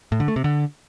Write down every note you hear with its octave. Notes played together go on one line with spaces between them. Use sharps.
A2
D3
A3
C3
D3